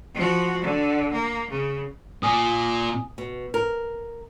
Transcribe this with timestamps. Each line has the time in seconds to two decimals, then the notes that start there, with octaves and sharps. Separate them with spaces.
0.15 F3 F#4
0.62 D3
1.12 A#3
1.50 C#3
2.23 A#2 G#5 D#6
3.18 B2
3.54 A#4